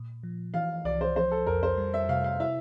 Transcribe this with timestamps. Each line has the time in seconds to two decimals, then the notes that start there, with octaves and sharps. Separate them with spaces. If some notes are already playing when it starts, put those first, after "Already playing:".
Already playing: A#2
0.23 F3
0.54 E3 F5
0.85 C2 D5
1.01 C5
1.16 F3 C5
1.32 A4
1.47 F2 A#4
1.63 C5
1.78 G3
1.94 E5
2.09 C3 F5
2.24 F5
2.40 E4 E5